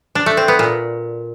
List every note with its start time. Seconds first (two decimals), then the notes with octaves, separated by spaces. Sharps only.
0.15 D4
0.26 A3
0.37 C4
0.48 B3
0.59 A#2